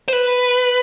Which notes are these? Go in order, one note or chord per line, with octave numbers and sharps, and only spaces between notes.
C5
B4